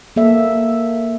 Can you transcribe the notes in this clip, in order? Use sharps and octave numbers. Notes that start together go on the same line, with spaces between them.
A#3 A4 E5